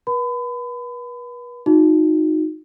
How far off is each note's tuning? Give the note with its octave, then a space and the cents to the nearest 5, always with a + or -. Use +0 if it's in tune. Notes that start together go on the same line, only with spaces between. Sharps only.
B4 -35 B5 +35
D#4 +0 F#4 -40